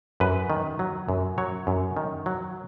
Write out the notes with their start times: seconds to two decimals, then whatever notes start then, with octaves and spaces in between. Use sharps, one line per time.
0.20 F#2 B4
0.50 D#3
0.79 F#3
1.09 F#2
1.38 F#3 C#5
1.67 F#2
1.97 D#3
2.26 F#3